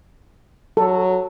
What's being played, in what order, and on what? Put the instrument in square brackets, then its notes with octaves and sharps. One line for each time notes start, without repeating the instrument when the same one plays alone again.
[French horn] F#3 [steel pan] A4